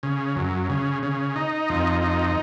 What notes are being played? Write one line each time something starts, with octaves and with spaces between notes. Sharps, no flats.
C#3
F#2
C#3
C#3
D#4
F2
D#4